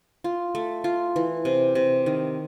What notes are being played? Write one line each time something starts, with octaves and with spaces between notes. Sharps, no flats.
F4
A3
F4
E3
C3
C3
D#3